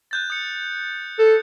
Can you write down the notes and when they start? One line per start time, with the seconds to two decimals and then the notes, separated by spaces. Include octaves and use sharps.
0.11 F#6 G6 A6
0.30 D#6 C#7
1.19 A4